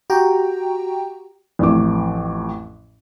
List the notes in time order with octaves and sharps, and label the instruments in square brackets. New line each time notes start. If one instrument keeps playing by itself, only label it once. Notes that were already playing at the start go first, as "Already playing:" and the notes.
[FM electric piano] F#4 G4 G5 A#5
[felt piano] A1 F2 A2 D6